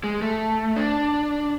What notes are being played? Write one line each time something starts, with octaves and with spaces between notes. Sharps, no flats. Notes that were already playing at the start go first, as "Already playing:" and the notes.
G#3
A3
D4